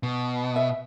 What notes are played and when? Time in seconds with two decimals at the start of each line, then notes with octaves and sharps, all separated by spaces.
0.03 B2
0.56 E5